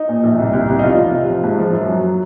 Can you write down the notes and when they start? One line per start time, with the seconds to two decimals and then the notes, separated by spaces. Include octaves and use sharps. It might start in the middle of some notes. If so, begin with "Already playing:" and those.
Already playing: D#4
0.09 A#2
0.24 A#1
0.39 C2
0.53 C2
0.69 C2
0.79 D#4
0.83 F1 F4
0.98 F1
1.13 C3
1.28 F3
1.44 G#2
1.59 F3
1.73 F#2
1.88 F#3